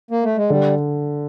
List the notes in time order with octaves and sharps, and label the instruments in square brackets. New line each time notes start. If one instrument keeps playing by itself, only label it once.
[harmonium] A#3
A3
G#3
[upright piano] D3 [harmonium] G3